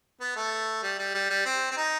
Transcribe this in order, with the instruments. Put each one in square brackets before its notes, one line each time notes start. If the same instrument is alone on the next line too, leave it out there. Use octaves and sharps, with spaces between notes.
[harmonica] B3
A3
G3
G3
G3
G3
C4
C4
D#4